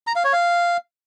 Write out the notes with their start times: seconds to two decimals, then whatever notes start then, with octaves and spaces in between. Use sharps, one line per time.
0.07 A#5
0.16 F5
0.24 C#5
0.33 F5